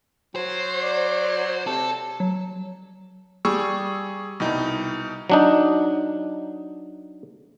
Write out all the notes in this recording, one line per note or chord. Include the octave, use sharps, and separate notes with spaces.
F#3 C5
D5
C3 A4
F#3
G3 G#4 C#6 E6
C2 B2 D#4
F#3 D4 D#4